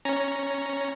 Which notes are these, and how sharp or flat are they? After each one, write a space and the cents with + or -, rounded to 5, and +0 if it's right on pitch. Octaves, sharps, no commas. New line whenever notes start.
C#4 +0 C#5 +10 A#5 +0